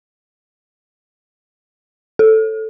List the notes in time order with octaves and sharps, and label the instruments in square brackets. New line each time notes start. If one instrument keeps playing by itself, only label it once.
[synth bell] A4